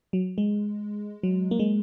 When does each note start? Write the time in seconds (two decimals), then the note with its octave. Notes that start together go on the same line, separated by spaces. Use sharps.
0.13 F#3
0.38 G#3
1.23 F#3
1.51 A#3
1.59 G#3